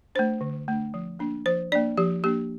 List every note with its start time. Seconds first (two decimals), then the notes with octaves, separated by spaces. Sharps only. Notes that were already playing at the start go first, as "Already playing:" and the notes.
0.15 A3 D4 C5
0.41 D3
0.68 A3 D4
0.94 F3
1.19 A#3 D4
1.46 F3 C5
1.72 A#3 D4 D5
1.97 F3 G4
2.24 A#3 D4 G4